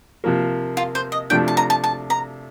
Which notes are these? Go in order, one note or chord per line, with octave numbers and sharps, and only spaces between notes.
C3 F3 A#3
F4
C5
D#5
C3 F3 A3 D4 G5
A5
A#5
A5
A5
A#5